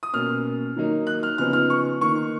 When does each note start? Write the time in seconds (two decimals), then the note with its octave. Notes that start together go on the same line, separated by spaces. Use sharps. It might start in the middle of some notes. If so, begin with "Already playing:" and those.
0.03 D#6
0.13 B2 A#3 C#4 F6
0.76 D#3 F#3 A#3 D#4
1.07 F#6
1.23 F6
1.38 C#3 F3 B3 D#4 F6
1.53 F6
1.70 C#6
2.01 D#3 A#3 D#4 C#6